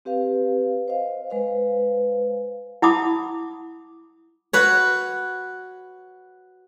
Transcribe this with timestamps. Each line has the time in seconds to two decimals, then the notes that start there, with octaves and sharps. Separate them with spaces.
0.05 C4 G4 B4 F5
0.88 C5 D#5 F5
1.30 G#3 B4 C5 F5
2.82 E4 F#5 A5 B5 D6 D#6
4.53 F#4 B4 C#5